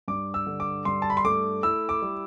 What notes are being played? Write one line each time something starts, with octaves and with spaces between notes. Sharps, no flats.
G2 D6
E6
D3
D6
G2 C6
A5
B5
C6
A3 D6
E4 E6
D6
G3